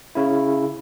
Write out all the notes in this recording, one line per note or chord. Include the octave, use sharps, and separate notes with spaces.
C#3 E4